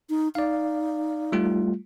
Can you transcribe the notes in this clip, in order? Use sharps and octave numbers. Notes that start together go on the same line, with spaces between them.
D#4
D#4 D5 F5
G3 A3 F4